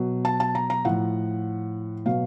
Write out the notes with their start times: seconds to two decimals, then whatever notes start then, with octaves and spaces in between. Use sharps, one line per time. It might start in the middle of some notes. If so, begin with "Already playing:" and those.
Already playing: B2 F#3
0.25 A5
0.40 A5
0.55 A#5
0.70 A#5
0.85 A2 F3 F#5
2.06 B2 F#3 F5